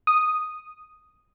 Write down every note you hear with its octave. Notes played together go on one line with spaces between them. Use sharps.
D#6